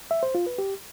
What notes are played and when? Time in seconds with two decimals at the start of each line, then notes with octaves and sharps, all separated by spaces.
0.11 E5
0.23 C5
0.35 F4
0.47 B4
0.58 G4